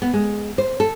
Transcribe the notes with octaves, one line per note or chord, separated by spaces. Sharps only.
B3
G#3
C5
A4